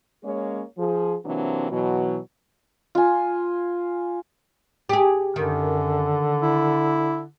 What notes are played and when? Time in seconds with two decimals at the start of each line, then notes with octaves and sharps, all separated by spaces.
0.24 G#3 A#3 C#4 G#4 C#5
0.78 F3 G#4
1.25 C3 E3 F#3 A#3 C4 D4
1.71 B2 E3 F#3
2.95 F4 G#5
4.89 G4 G#4
5.36 F#2 D3 D#3
6.42 E4